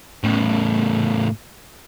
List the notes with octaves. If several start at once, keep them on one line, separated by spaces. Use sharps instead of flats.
A2 C#3